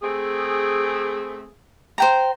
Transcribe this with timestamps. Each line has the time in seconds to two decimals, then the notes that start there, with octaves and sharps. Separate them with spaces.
0.02 A3 C4 G#4
1.98 C5 G5 A#5